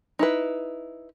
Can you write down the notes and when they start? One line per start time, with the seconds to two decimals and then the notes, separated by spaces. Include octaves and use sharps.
0.19 D#4 E4 B4